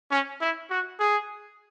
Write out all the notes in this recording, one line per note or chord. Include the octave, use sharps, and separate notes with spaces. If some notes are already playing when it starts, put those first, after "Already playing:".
C#4
E4
F#4
G#4